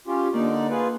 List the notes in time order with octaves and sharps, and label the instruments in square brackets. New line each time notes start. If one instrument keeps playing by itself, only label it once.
[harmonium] C#4 F4 G4
[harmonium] D3 D#4 D5 [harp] A#3
[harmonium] F4 G#4 B4